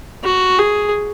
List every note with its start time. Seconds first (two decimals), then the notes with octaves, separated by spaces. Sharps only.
0.24 F#4
0.58 G#4